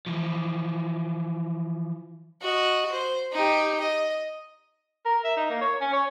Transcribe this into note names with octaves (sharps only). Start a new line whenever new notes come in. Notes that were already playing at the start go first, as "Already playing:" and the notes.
E3 F3
F#4 D#5
C5
D#4 G4
D#5
A#4
E5
D#4
A#3
C#5
C#4
C#5